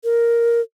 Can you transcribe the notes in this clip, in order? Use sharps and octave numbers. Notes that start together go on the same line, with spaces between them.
A#4